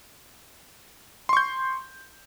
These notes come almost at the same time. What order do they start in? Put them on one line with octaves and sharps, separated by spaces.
C6 C#6 G6